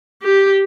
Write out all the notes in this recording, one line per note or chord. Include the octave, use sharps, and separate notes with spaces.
G4